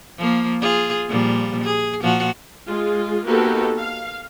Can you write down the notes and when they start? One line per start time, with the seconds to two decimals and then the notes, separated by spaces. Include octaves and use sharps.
0.18 F3 A#3
0.61 F4 G#4
1.09 A#2 F3 G3
1.64 G#4
2.02 A#2 F3 F#4
2.67 G#3 F4 G#4
3.25 A#3 B3 D#4 F#4 G4 A4
3.78 F5